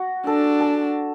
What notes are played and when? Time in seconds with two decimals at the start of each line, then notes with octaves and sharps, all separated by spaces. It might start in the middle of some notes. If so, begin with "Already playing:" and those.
Already playing: F#4
0.27 D4 A4
0.60 A4